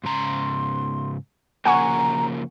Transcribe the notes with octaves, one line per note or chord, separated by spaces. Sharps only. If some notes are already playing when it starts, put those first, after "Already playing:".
G#2 C#3 A#5 C6
C#3 F3 A#3 F#5 G#5 A#5 C#6